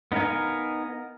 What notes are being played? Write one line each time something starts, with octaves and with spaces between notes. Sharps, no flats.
B3 D#4 A#4 F5 G#5